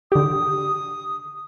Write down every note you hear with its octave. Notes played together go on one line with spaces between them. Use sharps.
D3 G4 D#6